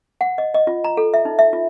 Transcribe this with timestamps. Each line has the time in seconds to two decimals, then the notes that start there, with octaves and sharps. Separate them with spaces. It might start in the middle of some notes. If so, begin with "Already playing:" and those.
0.21 F#5
0.38 D#5
0.54 D#5
0.67 F4
0.84 A#5
0.97 A4
1.14 E5
1.25 D#4
1.39 E5
1.53 F4